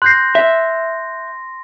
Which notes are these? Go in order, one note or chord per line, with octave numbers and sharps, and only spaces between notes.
C6 F#6 G6 A#6 C7
E5